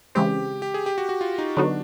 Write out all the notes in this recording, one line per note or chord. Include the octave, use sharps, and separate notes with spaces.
C#3 E3 G#3 C4 G4
G4
G#4
G4
F#4
F#4
F4
D#4
D3 F#3 B3 D4 D#4 F#4